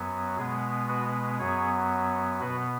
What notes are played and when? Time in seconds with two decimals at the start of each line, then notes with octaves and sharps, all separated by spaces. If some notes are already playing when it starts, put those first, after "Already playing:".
Already playing: F#2 F#3 B3
0.37 B2 G#3 B3 G#4
0.88 F#4 B4
1.39 F#2 F#3 B3 G#4 C#5
2.40 B2 B3 F#4 B4